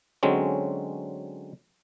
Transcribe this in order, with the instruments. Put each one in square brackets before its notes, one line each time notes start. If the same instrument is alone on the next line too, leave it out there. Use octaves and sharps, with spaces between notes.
[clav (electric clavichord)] D3 F#3 G#3 C4 C#4